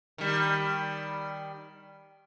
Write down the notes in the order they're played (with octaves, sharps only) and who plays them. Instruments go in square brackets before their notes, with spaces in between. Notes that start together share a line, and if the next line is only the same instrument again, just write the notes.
[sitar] D#3 G3